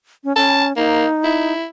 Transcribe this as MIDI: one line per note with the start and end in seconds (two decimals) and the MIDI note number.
0.24 0.35 61
0.36 0.75 61
0.36 0.65 81
0.76 1.06 58
0.76 1.54 63
1.24 1.66 64